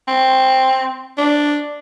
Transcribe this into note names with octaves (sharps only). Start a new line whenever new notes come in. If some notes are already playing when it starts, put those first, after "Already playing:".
C4
D4